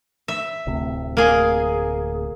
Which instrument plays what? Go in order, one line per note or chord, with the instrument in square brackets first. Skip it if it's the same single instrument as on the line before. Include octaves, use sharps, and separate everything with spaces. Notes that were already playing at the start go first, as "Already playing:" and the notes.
[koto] E5
[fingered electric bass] D1 D2 C3
[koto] A#3 G#4